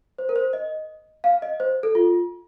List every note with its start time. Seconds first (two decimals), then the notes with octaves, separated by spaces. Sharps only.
0.18 C5
0.29 A#4
0.36 C5
0.53 D#5
1.24 F5
1.42 D#5
1.60 C5
1.83 A4
1.95 F4